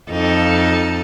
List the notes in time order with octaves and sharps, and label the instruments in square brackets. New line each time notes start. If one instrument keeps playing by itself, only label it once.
[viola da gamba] F2 D#4 A4